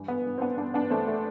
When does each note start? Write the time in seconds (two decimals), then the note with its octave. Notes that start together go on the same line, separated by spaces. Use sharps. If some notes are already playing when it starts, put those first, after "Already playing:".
Already playing: G2 E3
0.08 B3
0.26 G2
0.38 C4
0.41 B3 D4
0.58 G2 B3 D4
0.74 B3 D4
0.90 E3 A3 C4
1.07 A3